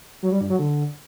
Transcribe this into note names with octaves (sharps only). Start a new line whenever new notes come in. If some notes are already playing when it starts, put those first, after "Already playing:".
F#3
G3
G2
F#3
D3